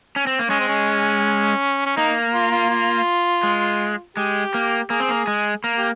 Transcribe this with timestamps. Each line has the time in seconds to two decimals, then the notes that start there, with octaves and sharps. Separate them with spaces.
0.16 C#4
0.27 C4
0.39 A#3
0.49 G#3 C#4
0.60 C4
0.68 C#4
1.86 C#4
1.97 A#3 D#4
2.33 F4
2.52 F4
2.70 F4
3.43 G#3
4.17 G#3 G4
4.54 A#3
4.90 A#3 G#4
5.00 C4
5.08 A#3
5.27 G#3
5.64 A#3
5.78 G4